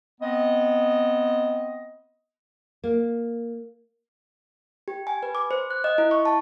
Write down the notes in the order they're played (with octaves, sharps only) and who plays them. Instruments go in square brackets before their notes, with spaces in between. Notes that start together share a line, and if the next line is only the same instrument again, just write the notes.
[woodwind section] B3 C4 D#5
[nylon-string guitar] A#3
[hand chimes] G4
G#5
B4
D6
C5
F#6
D#5
E4
C#6
A5